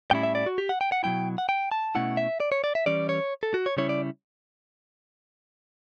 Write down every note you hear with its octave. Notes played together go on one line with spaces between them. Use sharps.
A2 G3 C#4 E4 G5
E5
D5
F#4
G4
F#5
G5
F#5
B2 F#3 A3 E4 G5
F#5
G5
A5
B2 A3 C#4 E4 F#5
E5
D5
C#5
D5
E5
E3 G3 C#4 D5
C#5
A4
F#4
C#5
C#3 G3 C#4 E4 C#5
D5